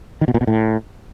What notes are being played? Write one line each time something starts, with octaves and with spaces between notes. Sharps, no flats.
D#3
B2
A#2
B2
A2